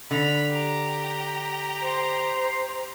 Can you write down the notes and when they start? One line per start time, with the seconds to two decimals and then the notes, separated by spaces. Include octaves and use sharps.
0.11 D3 B5 F7
0.51 G4 A#5
1.81 C5